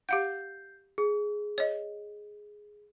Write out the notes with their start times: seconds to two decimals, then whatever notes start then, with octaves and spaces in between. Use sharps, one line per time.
0.09 G4 F5 F#5 G6 C7
0.98 G#4
1.58 C#5 D#5